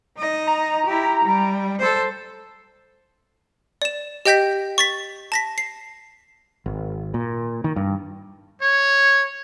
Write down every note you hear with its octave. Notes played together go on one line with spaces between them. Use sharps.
D#4 D#5
A#5
E4 G4
G3
A4 C5
D5 E7
G4 D#5 G5 G6 A#6 B6
C#6 A6 B6
A5 A#6 B6
C7
G#1
A#2
D#3
G2
C#5